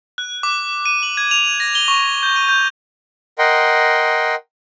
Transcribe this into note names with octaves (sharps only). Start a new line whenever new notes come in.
F#6
D6
D#7
F#7
G#6
F7
A#6
G7
C#6
G6
D#7
G6
A#4 D#5 F#5 G5 C6